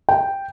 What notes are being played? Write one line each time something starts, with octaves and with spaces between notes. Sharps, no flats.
G5